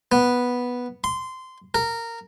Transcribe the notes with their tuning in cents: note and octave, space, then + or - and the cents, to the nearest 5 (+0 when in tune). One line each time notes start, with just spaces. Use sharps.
B3 -5
C6 -15
A#4 -15